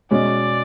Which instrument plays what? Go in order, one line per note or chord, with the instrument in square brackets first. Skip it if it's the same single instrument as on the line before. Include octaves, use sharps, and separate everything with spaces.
[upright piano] B2 G#3 C#4 [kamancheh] D5